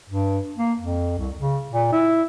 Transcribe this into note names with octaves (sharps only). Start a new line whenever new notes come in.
G2
A#3
F2
C2
C#3
A#2
E4